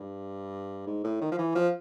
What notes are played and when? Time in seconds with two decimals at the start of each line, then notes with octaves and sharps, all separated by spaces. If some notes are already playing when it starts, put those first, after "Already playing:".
Already playing: G2
0.86 G#2
1.04 A2
1.21 D#3
1.31 F3
1.38 E3
1.55 F3